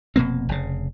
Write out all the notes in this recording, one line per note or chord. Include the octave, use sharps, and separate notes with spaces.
F1 B2 A#3 C4
F1 C#3